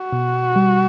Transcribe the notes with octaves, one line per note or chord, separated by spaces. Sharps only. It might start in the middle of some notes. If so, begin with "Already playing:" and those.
Already playing: F#4
B2
G3